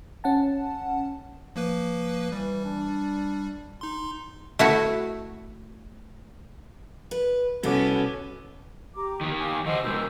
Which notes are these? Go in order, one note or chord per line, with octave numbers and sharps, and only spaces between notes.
C#4 F#5 A5
F3 A#3 B4
E3 G3
D4
D#4 C6
A3 E4 F#4
B4
C2 B2 B3 C#4 A4 D6
G4 A#5 D6
D#3 G4 G5
F5 G#5 D6
D#3 C5 D#5 F#5 E6
B2 G#3 A#4 E6 G6